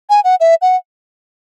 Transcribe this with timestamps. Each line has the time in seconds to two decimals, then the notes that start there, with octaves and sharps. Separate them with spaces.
0.10 G#5
0.24 F#5
0.40 E5
0.62 F#5